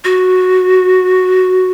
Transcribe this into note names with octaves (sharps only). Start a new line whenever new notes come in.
F#4